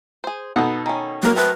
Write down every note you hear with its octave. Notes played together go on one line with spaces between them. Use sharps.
G#4 C5
B2 B3 D#4 A4 F#5
D#3 C#4
F#3 A#3 A#4
A3 C4 B4